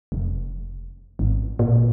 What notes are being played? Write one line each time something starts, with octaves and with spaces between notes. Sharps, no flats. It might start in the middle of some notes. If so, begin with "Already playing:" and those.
F1
G#1
A#2